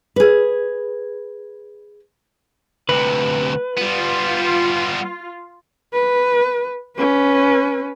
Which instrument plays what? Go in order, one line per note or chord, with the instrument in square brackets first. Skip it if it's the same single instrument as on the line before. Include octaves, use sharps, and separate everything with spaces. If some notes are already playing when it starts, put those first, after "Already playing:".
[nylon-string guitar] G#4 B4
[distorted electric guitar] D2 C3 [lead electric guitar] B4
[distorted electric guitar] G3 B3 [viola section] F4
[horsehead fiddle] B4
C#4 B4